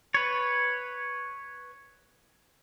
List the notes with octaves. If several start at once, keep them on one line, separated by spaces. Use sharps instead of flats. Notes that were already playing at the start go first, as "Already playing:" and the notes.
B4 C#5